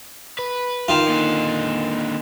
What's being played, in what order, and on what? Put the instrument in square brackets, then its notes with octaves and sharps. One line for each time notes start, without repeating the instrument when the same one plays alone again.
[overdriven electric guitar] B4
[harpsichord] D#3 F4
[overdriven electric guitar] A#2 D3